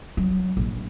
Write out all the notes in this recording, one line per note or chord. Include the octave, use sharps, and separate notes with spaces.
F#3
A#1